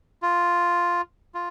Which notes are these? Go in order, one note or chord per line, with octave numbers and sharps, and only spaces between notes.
F4
F4